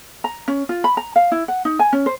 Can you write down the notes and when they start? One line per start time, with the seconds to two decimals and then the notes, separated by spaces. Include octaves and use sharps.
0.24 A#5
0.48 C#4
0.69 F4
0.84 B5
0.97 A#5
1.16 F5
1.32 E4
1.48 F#5
1.65 D#4
1.79 G#5
1.93 C#4
2.06 C5